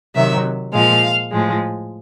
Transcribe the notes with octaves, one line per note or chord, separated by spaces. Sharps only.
C3 D#3 F#3 E5
A#2 F3 G#3 F5
A2 F3 G#3